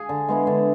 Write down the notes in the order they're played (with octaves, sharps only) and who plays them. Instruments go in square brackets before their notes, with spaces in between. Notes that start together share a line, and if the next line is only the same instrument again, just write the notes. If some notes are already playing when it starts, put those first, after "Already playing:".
Already playing: [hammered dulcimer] G#4
D3
G#3 B3 E4
D3